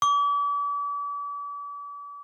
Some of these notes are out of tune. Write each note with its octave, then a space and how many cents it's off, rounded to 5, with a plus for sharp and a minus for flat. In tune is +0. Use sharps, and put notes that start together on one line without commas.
D6 -40